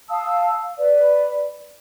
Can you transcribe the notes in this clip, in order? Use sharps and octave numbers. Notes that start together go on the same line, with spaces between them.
F5 A5 D#6 E6
B4 D5